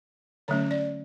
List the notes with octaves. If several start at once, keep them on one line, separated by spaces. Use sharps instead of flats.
D3 F#3 A3 C#4 C#5
D5